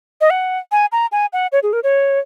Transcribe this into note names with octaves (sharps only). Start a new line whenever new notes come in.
D#5
F#5
G#5
A#5
G#5
F#5
C#5
G#4
A#4
C#5